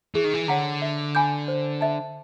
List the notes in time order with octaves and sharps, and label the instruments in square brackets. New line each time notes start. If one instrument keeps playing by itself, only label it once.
[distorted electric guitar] E3 [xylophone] G#4
[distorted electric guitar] D#3
E3
[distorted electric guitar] D3 [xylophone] C#5 F#5 A#5
[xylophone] E5
G#5 B5 D6 G6
C5
E5 A5